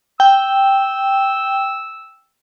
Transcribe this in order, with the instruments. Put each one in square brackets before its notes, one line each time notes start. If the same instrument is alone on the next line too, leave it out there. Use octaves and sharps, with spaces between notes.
[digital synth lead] G5 [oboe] E6